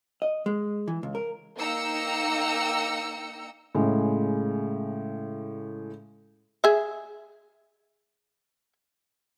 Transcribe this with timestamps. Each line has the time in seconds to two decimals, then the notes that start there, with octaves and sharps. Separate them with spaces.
0.22 D#5
0.46 G#3
0.88 E3
1.03 C#2
1.15 A#4
1.57 A#3 D#4 G5 A#5 E6 C#7
3.75 A2 C#3 G#3
6.64 G#4 E5